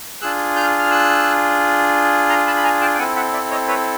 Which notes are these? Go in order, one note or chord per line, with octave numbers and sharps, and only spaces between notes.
D4 F4 G#4 E6 F#6
F6 G6
F6
E6 F#6
A#5 C6
A5 B5
B5
G#5 A#5
G5 A5
G5
C4 E4 A4 F#5 G#5
E5 F#5
D5 E5
C#5 D#5
B4 C#5